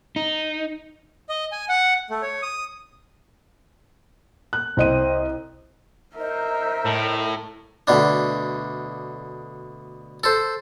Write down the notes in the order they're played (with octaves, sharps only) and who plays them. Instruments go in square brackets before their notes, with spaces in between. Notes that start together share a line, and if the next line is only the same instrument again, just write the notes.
[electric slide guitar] D#4
[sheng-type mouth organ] D#5
G#5
F#5
A3
C#5
D#6
[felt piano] F#6
[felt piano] C2 D#5 D#7 [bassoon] C4
[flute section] D#4 C5 [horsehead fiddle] A#4 E5
[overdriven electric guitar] A2
[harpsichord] D2 B2 D4
A4 C5